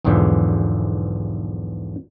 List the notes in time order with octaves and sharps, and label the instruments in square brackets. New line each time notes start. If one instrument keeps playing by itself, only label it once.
[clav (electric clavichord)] B1 E2 G#2 D3 E3 F3